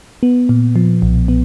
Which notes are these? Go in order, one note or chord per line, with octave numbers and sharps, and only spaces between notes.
B3
A#2
F3
B1
B3